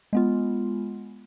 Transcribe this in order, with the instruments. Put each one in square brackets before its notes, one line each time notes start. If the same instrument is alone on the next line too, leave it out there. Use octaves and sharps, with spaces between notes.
[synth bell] G#3 B3 F4